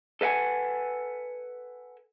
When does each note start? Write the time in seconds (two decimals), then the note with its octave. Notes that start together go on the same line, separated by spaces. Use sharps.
0.21 A4 B4 F5 F#5 G#5